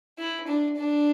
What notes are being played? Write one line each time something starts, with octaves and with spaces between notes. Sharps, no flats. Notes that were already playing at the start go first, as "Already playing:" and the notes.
E4
D4
D4